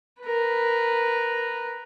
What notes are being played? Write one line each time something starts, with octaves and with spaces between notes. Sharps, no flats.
A#4 B4